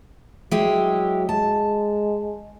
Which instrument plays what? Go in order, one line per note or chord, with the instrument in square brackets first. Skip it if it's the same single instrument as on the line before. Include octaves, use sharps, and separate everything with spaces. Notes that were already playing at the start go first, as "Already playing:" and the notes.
[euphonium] F#3 [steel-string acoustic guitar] G#3 E4 G4
[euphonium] G#3 [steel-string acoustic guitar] A5